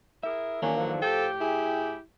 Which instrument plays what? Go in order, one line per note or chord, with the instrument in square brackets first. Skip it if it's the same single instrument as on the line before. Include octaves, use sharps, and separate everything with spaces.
[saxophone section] E4 G#4 A#4 [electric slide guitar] E5
[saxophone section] E2 F#3 [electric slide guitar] D#3 E3 D4 [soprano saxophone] A#3 [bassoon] C#4
[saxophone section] F#2 D3 F#3 [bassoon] F3
[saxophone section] A2 G4 [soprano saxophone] A4 [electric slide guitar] G5
[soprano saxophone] E4 [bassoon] G#4